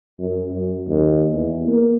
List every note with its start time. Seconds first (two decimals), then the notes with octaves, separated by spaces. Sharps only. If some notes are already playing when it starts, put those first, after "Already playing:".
0.19 F#2
0.50 F#2
0.88 D#2
1.32 E2
1.67 A#3